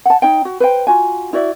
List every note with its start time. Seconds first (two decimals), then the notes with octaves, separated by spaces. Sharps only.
0.05 F#5 A5
0.22 D#4 C#5 G5
0.45 F#4
0.60 B4 C5 G5
0.87 F4 F#4 G#5
1.33 E4 F#4 D5 E5